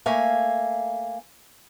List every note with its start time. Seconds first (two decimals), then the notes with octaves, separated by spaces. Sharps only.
0.06 A3 A#3 E5 F5 G#5